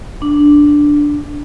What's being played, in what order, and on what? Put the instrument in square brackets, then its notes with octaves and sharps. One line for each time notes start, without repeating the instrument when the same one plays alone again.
[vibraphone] D4